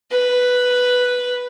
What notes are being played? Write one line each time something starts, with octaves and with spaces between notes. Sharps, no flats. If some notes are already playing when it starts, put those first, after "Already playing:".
B4